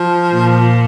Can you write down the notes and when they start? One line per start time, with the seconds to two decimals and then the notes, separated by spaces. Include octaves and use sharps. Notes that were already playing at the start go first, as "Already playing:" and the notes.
Already playing: F3
0.33 A#2